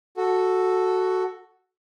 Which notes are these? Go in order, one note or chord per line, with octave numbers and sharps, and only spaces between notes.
F#4 A4